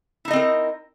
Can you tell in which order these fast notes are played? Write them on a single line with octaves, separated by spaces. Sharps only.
E4 D#4 D#5 C4 A#4